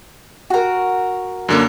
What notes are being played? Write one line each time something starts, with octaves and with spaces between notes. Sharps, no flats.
F#4 A#4
F#2 D3 A#3